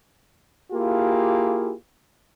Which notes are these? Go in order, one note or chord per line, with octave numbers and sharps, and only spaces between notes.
A#3 E4 F4 G4 G#4